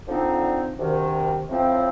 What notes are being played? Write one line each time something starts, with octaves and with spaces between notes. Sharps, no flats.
D3 F3 C4 D#4
D2 C3 D#3
A2 F3 C4 F4